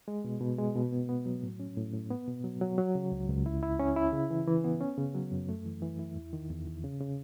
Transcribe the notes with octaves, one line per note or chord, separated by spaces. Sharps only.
G#3
B2
B2
G#3
B2
B3
B3
F#3
A2
C#4
A2
A2
B3
B2
F#3
F#3
F#3
C#3
C#2
C#2
E4
E4
C#4
E4
C#3
E3
E3
B3
C#4
C#3
F#3
F#2
A3
E3
E3
E4
E2
D#3
E2
E2
C#3
C#3